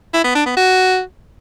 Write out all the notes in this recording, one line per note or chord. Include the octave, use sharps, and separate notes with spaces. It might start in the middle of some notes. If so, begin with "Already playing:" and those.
E4
B3
D4
B3
F#4